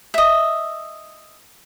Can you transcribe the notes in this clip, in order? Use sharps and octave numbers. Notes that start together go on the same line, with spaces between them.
D#5 E5